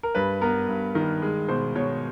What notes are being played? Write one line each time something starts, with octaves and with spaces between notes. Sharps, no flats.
A#4
G2 B4
B3 A#4
G2
D#3
G#3
B2 C5
B2 C#5